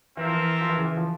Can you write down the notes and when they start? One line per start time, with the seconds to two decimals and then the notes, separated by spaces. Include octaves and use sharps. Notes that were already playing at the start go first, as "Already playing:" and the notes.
0.17 E3 C4 F4 A#4 E5
0.26 F3
0.34 E3
0.61 F3
0.69 E3
0.77 C#3
0.85 E3
0.97 F3